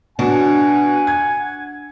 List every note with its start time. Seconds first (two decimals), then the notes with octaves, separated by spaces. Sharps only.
0.19 B2 D4 F#5 G#5
1.07 G#6